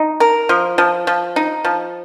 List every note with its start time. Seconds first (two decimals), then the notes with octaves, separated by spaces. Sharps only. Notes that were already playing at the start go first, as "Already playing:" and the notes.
Already playing: D#4
0.20 A#4
0.49 F3
0.78 F3
1.07 F3
1.36 D#4
1.64 F3